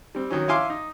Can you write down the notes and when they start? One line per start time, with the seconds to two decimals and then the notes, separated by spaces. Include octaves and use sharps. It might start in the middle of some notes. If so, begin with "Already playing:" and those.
0.15 G3 C4
0.31 D#3 F#3 C#4
0.48 E4 F5 G#5 C6 D6
0.70 D#4